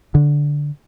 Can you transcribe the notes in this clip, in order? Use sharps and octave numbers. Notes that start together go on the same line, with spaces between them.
D3